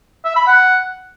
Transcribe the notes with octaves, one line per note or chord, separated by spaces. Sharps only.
E5
B5
F#5